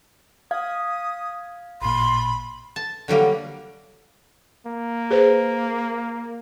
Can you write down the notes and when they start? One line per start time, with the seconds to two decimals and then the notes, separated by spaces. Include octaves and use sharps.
0.51 F5 D#6 G#6
1.82 A1 A#2 B5 C6
2.76 A5
3.08 D3 F#3 G3 A#3
4.66 A#3
5.11 G#4 B4 C5